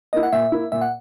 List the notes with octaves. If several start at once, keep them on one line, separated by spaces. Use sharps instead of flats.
A#3 E4 D#5
F#5
A#2 E5
A#3 E4
A#2 E5
F#5